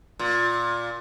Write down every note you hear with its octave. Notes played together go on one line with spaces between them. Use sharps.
A#2